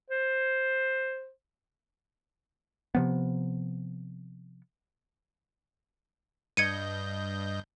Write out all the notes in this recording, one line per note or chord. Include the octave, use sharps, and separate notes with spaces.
C5
C3 F3 B3
G2 D#5 G6 G#6 C#7 D#7